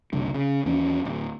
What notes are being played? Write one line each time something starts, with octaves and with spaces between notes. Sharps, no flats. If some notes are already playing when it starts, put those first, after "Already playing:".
F#1 C2 D3
C#3
D#2 E3 C#4
D1